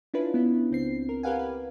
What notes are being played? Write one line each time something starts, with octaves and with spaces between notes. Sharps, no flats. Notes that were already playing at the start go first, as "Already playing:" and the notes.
C#4 D4 E4 F4 B4
B3 E4
C#2 C4 C7
A#4
G4 A#4 B4 F5 F#5 G#5
B4